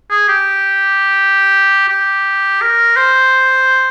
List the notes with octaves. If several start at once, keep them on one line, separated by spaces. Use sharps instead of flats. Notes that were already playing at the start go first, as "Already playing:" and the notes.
G#4
G4
G4
A#4
C5